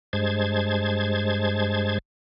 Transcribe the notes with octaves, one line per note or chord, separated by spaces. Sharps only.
G2 G#3 C5 A5 G#6